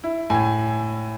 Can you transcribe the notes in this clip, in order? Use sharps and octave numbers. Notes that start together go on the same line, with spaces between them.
E4
A2 G#5